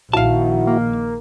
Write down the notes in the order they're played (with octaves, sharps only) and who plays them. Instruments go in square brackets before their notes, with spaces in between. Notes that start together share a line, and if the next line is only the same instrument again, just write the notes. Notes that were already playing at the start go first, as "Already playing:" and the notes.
[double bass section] A#1 D#3 [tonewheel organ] E4 F#4 [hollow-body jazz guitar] F5 A5
[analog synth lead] A#3